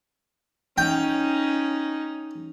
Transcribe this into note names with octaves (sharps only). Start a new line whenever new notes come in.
C#4 D#4 G5